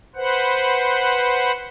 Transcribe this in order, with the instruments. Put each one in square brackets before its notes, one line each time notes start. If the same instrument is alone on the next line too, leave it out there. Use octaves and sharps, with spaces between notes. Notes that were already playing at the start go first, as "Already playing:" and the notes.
[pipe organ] B4 C5 F#5